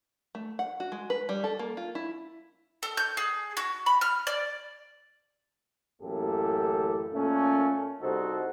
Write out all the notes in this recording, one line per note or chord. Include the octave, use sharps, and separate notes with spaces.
A3
F#5
F#4
G#3
B4
G3
A4
A#3
F4
E4
A4
G6
G#4
F#4
B5
F6
D5
A1 F#2 A#3 E4 G4 A4
A#2 A3 A#3 C#4
C2 C3 D#4 F#4 A4 C5